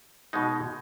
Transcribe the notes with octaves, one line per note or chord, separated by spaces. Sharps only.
B2 G#3 D#4